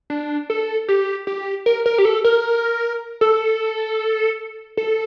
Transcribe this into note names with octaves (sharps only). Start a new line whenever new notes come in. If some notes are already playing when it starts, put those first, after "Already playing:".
D4
A4
G4
G4
A#4
A#4
G4
A4
A#4
A4
A4